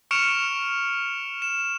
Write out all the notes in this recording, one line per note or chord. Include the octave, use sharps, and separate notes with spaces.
C#6 F6 C#7 D7 E7 F7
E7